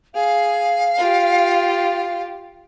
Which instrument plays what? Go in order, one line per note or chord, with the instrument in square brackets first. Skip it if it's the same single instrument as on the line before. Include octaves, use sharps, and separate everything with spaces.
[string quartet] G#4 [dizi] F5
[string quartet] F4 G4